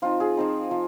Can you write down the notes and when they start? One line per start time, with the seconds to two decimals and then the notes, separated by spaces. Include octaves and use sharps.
0.02 F3 C4 D#4 F4
0.20 G#4
0.37 F3 C4 D#4
0.71 F3